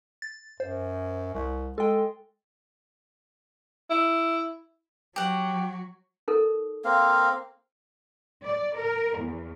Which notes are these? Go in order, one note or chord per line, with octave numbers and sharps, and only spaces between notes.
A6
F#2 C5
C2
G#3 A4 G5
E4
F#3 F#4 G4 F#5
D#4 A4 A#4
A#3 C4 F5
D5
A#4
E2